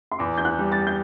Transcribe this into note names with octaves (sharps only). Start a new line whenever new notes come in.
C6
E2 D6
G6
F#6
G3
A6
G6